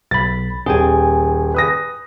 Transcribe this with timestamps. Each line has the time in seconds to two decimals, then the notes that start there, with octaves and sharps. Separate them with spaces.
0.11 B1 B5 A6
0.66 D#1 G#4 G5 G#5
1.54 B4 D#6 A#6